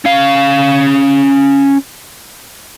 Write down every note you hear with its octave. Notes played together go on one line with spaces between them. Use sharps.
C#4 F5